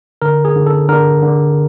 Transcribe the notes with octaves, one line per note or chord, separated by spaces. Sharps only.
D3 A#4
G#4
D3
A4
D3 A#4
D3